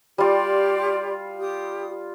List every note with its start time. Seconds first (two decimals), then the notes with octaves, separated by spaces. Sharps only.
0.18 G3 F4 G4 D5 C6
1.39 G4 D#6